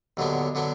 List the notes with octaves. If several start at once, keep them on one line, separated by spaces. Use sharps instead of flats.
D#2 D3 F#3 B3 D4
D3 F#3 B3 D4